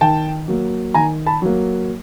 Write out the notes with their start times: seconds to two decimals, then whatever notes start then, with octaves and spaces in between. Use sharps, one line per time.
0.01 D#3 G5 A5
0.48 F#3 A#3
0.94 D#3 G#5 A#5
1.27 A5 B5
1.42 F#3 A#3